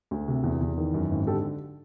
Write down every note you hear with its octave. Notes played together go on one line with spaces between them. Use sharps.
D2
C3
E2
E2
D#3
F#2
G#1
D3 G4 A4